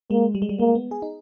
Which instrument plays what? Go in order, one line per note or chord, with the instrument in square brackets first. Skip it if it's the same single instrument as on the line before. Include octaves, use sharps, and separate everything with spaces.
[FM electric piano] G#3 [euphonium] A#3
[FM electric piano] G3
G#3
G3
[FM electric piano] G#3 [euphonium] A#3
[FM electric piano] B3
G#4
D#4